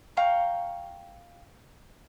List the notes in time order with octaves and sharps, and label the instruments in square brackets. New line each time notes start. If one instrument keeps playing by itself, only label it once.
[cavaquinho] F5 G5 A#5 C#6